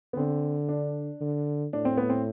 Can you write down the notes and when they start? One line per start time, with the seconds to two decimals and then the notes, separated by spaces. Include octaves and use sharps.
0.13 B3
0.17 D3 C4
0.69 D4
1.21 D3
1.73 A2 D4
1.85 C4
1.97 B3
2.10 C4